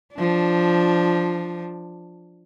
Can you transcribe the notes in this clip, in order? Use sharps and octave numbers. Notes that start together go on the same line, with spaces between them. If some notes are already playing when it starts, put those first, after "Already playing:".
F3 D4